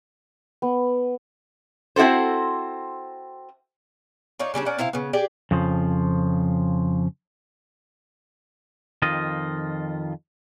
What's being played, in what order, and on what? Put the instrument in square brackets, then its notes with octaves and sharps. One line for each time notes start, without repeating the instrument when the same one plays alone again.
[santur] B3
[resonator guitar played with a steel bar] C4 E4 F#4 A4 C5
[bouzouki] D#4 F4 C#5 D5
C#3 G3 C#4 D4
C#4 A#4 D5 F#5
C3 E4 C5 F5
C#3 B3
G4 G#4 D5
[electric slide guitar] F2 C#3 F3
[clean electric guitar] F2 D#3 F4 D#5